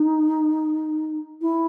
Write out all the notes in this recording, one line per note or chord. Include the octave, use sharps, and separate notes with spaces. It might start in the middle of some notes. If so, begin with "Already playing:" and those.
Already playing: D#4
E4